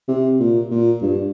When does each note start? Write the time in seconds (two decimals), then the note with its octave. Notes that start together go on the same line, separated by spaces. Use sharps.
0.08 C3
0.40 A#2
0.71 A#2
1.02 G2